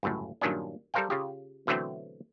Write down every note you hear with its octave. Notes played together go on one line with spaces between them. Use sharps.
G1 C#2 F#2 A2
G2 A#2 D#3 F#3 C#4 D4
G3 A4 A#4 C5 F5 G5
C#3 F4 G4
B2 D3 E3 F#3 A3 C4